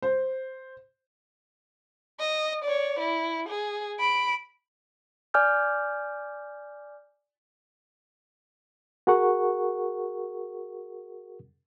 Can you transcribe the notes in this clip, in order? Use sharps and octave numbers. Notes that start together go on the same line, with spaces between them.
C5
D#5
C#5 D5
E4
G#4
B5 D7
D5 G#5 D6 F6 G6
F#4 G#4 A#4 F#5 C#6